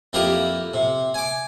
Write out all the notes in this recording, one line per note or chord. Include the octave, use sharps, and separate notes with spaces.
F2 A#3 E4 G4 A#5 D#6
C3
G#5 D6